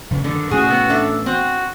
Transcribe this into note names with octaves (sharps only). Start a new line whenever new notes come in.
E1 C#3
G2 D3 D#3
A2 E3 C#4 F#4 G#4
C3 B3
D4 A4 E5
C4 F#4